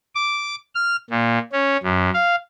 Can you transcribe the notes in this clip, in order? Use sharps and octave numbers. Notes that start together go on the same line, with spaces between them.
D6
F6
A#2
C#4
F#2
F5